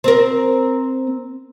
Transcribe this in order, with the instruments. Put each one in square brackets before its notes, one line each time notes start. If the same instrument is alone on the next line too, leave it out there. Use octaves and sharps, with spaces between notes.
[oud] C4 A#4